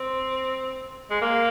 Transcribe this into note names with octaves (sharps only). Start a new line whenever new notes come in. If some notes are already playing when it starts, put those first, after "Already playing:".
Already playing: C4
G#3
A#3